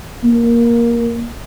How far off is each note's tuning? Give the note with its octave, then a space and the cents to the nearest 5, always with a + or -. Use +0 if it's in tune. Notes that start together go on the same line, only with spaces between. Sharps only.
A#3 +10